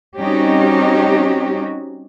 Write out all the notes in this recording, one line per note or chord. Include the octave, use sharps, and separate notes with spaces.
G3 C4 C#4 D#4 F#4 G4